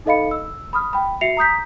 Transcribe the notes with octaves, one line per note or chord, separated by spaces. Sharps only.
D#4 A4 D#5 F5 B5 C#7
E6
B5 D#6 F6
G5 B5
F#4 E5 C7 C#7 F7
A#5 D#6 G6 B6